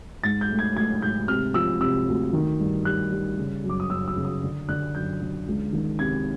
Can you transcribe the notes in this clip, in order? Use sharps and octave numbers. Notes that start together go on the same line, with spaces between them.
G#2 A6
G6
A3
G#6
A3 G#6
G#2 G6
C3 F6
F3 E6
C3 E6
D2
D#3
G2
G3 F#6
G3
C#3
F#2
D6
D#6
F#2 E6
E6
C#3
D#6
D3
D3 F#6
F#2 G6
D3
C#2
D#3
C3 G#6